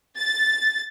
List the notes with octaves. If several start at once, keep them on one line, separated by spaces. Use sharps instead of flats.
A6